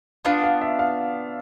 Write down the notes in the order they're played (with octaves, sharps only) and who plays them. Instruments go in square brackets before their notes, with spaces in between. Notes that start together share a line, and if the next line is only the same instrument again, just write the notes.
[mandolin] B3 D4 F4 [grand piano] F5
[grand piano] F5
E5
F5